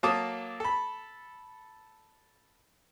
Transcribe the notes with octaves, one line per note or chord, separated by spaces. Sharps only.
F#3 A#3 A4 A5 D6 D#6
A4 B5